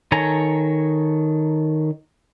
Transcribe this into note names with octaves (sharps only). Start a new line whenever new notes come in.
D#3 A4 C#5 G#5 A#5